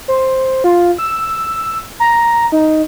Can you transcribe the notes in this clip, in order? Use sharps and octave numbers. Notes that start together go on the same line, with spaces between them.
C5
F4
E6
A#5
D#4